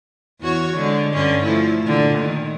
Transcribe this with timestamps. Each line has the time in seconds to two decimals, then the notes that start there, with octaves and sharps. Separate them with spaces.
0.41 E2 F#4 C#5
0.76 D3 G#3
1.14 G2 D3 C#4
1.43 F3 A3 E4
1.83 A#2 D3
2.19 D#3